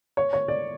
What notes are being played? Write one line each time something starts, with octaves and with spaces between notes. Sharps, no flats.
C#5
C#5
D5